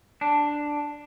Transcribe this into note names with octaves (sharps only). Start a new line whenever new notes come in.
D4